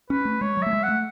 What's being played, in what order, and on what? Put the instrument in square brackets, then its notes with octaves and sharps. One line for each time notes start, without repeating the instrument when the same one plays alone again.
[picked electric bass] C#4 [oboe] B4
[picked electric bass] A3
[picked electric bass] G#3 [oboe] C#5
[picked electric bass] F#3
[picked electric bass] A3 [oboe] E5
[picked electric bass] G#3
[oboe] F#5
[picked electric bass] A3